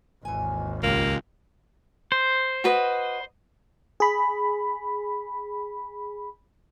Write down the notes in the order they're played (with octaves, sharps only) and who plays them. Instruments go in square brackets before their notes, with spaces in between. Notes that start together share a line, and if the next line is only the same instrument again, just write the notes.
[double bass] G#1 D#2 [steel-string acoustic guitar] E3 G#5
[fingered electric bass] C#2 [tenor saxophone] A#3 [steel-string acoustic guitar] F4 G4
[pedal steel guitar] C5
[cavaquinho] F#4 B4 D#5
[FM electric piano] G#4 B5